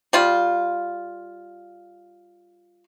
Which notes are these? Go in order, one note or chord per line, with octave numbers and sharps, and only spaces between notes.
G3 F4